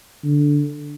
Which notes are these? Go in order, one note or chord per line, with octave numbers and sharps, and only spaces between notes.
D3